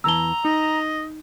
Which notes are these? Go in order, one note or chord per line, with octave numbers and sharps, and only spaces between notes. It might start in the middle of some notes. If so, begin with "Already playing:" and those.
E2 E3 A5 A#5 E6 G7
D#4 D#5